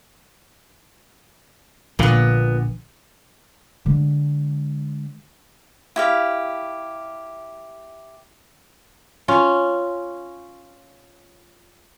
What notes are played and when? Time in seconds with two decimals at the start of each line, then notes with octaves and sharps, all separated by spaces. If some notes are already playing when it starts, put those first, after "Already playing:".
1.99 A#1 A#2 D3 B3
3.86 D3 G#3
5.96 E4 G4 F5
9.28 C#4 F4